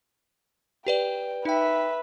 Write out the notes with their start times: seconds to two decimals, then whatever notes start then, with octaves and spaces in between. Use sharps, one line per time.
0.87 G4 B4 D5 G5
1.45 D#4 B4 E5 G5